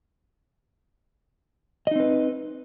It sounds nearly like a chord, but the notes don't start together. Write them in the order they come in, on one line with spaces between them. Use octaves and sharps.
D#5 D#4 C4 B4